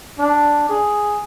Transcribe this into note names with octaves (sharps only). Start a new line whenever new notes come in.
D4
G#4